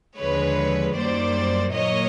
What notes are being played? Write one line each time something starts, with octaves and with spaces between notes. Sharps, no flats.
D#2 D3 F3 G#3 B4 C#5
F#2 D#3 G3 A#3 C5 D5
A#2 F#3 A#3 C#5 D#5